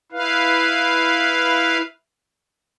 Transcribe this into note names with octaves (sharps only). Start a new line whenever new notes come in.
E4 B4 F5